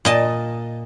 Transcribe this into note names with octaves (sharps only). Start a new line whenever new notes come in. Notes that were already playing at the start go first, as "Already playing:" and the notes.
A#2 D#5 A5